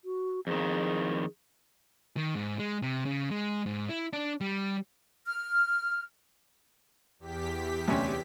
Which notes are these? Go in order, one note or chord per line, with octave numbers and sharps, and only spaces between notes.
F#4
F2 D#3 G#4
D#3
G#2
G#3
C3
C#3
G#3
G#2
E4
D4
G3
F6
E2 G4 B6
D2 C3 C#4